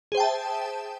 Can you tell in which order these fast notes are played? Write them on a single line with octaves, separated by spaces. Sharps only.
G#4 C5 G5 A5 E5